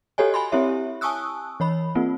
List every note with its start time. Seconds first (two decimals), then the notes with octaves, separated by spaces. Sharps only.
0.18 F#4 G4 A4 C#5 D#5 G#5
0.34 G#5 B5 C6
0.52 C4 E4 G4 C#5 E5
1.01 G#5 A5 C#6 D#6 E6 F#6
1.60 E3 C#5 B5
1.95 A#3 C4 F4